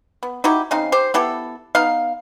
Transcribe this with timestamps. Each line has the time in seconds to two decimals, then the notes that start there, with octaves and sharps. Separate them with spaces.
0.23 B3
0.44 D#4 E4 F#4 G4
0.71 C#3 C4 D#4 F5
0.92 G4 C5
1.14 B3 E4 G4 A4
1.75 B3 D#4 F5